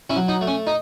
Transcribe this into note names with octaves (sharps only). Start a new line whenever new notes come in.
C#4 E4
F#3
D#4
A3
C#4
D#4